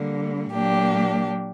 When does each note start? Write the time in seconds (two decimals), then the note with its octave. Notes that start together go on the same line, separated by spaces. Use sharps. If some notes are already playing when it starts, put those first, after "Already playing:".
Already playing: D3 G3 A#3
0.53 A#2 F#3 A#3 D4 G4